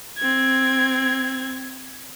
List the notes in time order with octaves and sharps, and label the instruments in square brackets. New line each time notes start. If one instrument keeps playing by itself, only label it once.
[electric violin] C4 G#6